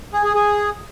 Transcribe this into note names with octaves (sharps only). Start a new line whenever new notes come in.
G#4
G#4
G#4